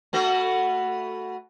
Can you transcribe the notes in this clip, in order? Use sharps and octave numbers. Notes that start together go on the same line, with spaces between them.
A3 B3 F#4